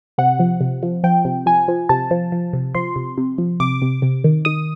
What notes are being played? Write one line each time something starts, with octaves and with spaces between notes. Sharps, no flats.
C3 F#5
F3
C3
F3
F3 G5
C3
F3 G#5
F3
C3 A5
F3
F3
C3
F3 C6
C3
C3
F3
C3 D6
C3
C3
D#3
D#3 D#6